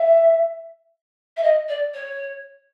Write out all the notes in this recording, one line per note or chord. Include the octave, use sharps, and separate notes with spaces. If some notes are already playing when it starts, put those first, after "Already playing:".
Already playing: E5
E5
D#5
D5
C#5